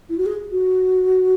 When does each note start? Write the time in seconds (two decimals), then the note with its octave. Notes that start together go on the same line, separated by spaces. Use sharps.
0.09 E4
0.18 F#4
0.26 G#4
0.52 F#4